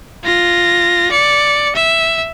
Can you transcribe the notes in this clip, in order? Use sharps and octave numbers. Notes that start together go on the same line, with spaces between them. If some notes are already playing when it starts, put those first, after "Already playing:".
F4 A#6
D5 C#7
E5